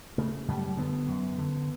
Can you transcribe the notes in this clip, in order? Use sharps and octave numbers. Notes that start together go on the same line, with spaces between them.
C#3 A3
F#2 G3
D3 B3
F#2
D3